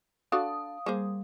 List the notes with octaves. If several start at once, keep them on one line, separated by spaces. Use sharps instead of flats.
D4 F#4 A4 F5 D#6
G3 A#3 G#4 C5